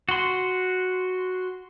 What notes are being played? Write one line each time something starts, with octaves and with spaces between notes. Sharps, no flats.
F#4 C6